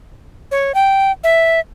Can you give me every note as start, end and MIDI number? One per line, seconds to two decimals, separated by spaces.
0.51 0.72 73
0.75 1.11 79
1.24 1.60 76